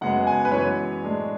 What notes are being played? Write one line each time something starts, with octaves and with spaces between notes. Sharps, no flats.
F#2 C#3 G#3 B3 F#5
G#5
B4
F#2 E3 G#3 C#5
A2 G#3 D4